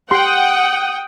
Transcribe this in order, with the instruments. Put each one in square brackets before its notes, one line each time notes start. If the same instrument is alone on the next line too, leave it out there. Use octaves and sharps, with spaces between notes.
[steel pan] G4 C6 [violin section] F#5 D#6 [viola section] G5